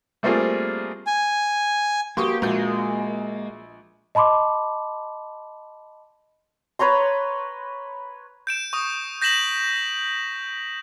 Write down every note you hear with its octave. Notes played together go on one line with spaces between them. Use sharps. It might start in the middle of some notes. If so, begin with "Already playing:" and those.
G3 A3 A#3 C4 F4 G#4
G#5
G3 A#3 B3 F#4 G4 C6 C#6 D#6
A#1 G#3 F#4 G6
D#5 A5 B5 C6 D6
B4 C#5 A#5 C6
G6 D7 E7
C#6 D#6
G6 A#6 B6 E7 F#7